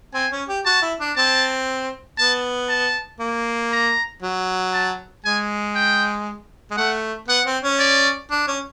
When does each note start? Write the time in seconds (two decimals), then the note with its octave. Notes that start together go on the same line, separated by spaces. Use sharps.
0.14 C4 G#5
0.32 C#4
0.48 G4
0.66 F#4 A5
0.82 E4
1.00 D4
1.16 C4 A5
2.18 B3 A5
2.69 A5
3.20 A#3
3.72 A#5
4.22 F#3
4.74 A5
5.25 G#3 G#5
5.75 G5
6.71 G#3
6.77 A3 F#5
7.28 B3 F#5
7.46 C4
7.63 C#4
7.79 D5
8.31 D4
8.47 C#4